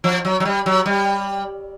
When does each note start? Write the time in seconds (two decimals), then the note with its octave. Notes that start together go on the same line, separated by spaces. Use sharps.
0.04 F3
0.25 F#3
0.40 F#3
0.45 G3
0.66 F#3
0.86 G3